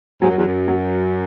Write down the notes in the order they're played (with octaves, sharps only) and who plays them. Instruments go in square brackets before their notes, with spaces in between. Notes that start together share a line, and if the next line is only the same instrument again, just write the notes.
[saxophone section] G#2 [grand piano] F#3
[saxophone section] F#2
E2
F#2
[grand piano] F#3